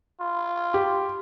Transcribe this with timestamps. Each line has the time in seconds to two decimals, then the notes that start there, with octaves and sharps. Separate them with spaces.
0.20 F4
0.74 G4